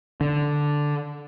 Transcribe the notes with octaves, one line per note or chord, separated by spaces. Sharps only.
D3